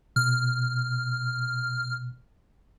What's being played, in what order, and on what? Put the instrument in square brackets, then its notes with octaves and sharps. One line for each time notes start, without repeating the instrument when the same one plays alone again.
[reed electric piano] B2 [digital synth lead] F6